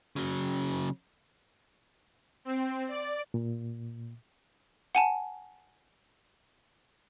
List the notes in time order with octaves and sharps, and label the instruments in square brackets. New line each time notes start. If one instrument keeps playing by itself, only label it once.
[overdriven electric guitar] C#3 F#3
[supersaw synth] C4
D5
[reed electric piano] A#2
[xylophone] F#5 G#5 A5